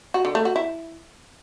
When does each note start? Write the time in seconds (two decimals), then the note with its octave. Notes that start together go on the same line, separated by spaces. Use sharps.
0.14 F#4
0.25 D3
0.35 A3
0.45 F#4
0.56 E4